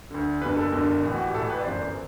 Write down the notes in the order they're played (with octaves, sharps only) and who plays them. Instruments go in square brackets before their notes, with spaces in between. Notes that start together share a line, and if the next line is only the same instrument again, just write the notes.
[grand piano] D2 D3
F#1 E2 D3 B4
A4
F#1 E2 D3
A1 A2 E3
F#4
G4
A1 A2 E3 A4
B4
D5
G1 F#2 E3 C5